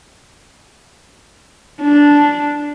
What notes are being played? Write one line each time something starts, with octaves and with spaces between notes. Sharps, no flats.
D4